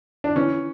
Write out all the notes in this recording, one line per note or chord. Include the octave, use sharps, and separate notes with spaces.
D4
E3 C#4